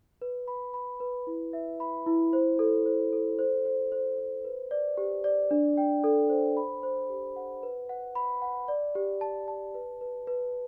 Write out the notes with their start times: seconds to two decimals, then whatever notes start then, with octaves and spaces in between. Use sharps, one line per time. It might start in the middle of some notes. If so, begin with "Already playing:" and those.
0.22 B4
0.48 B5
0.74 B5
1.00 B4
1.27 E4
1.53 E5
1.80 B5
2.06 E4
2.33 C5
2.59 A4
2.86 C5
3.13 A4
3.39 C5
3.65 C5
3.92 C5
4.19 C5
4.45 B4
4.71 D5
4.97 G4
5.24 D5
5.51 D4
5.77 G5
6.04 A4
6.30 C5
6.57 B5
6.83 C5
7.10 G4
7.36 F#5
7.63 B4
7.89 F#5
8.15 B5
8.42 F#5
8.68 D5
8.95 G4
9.21 A5
9.48 A5
9.75 B4
10.01 B4
10.27 B4